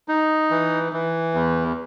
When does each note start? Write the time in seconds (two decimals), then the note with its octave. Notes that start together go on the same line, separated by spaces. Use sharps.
0.08 D#4
0.51 E3
0.93 E3
1.34 E2